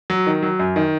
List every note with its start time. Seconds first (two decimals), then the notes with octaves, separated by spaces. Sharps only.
0.10 F#3
0.27 D#3
0.43 F#3
0.59 F#2
0.76 D#3